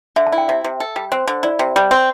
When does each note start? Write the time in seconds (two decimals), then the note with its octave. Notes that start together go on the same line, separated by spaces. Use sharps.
0.16 D3 E5
0.27 A5
0.32 E4
0.38 G5
0.48 C3 E5
0.64 C3
0.80 A4
0.96 G3
1.12 C4 C5
1.28 D3
1.43 E4 D5
1.59 C3
1.76 G3
1.91 C4